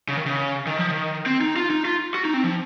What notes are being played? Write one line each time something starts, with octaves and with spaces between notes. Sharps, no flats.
C#3
D#3
C#3
D#3
F3
D#3
C4
D#4
F4
D#4
F4
F#4
D#4
C4
F3